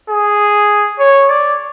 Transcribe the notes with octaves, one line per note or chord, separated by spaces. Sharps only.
G#4
C#5
D5